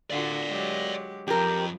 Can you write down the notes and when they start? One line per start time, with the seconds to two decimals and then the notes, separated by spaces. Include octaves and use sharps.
0.10 D3 F4 F#4 D5 F5
0.48 F#3 G#3 G4
1.27 F2 F3 G4 A#4